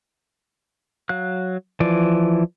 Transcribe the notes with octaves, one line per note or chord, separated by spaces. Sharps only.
F#3 F5 F#6
E3 F3 D5